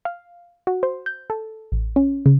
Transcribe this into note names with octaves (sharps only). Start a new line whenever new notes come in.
F5
F#4
C5
G6
A4
A1
C#4
C#3